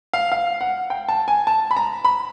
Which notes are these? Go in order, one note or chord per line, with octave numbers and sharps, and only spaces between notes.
F5
F5
F#5
G5
A5
G#5
A5
B5
A#5
B5